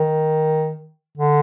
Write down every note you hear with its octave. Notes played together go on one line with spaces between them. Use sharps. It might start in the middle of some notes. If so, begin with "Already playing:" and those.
Already playing: D#3
D3